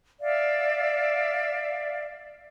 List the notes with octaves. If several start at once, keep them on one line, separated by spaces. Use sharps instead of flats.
D5 E5 F5